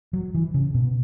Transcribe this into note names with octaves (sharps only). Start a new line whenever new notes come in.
F#3
E3
C#3
B2